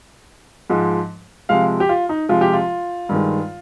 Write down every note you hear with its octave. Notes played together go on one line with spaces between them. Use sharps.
G#2 F3 G#3
C3 F3 G#3 F5
G4
F4
D#4
C3 F3 G#3 F4
G4
F4
G2 D#3 G#3